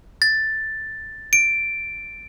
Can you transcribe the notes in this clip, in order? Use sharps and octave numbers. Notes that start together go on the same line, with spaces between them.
A6
D7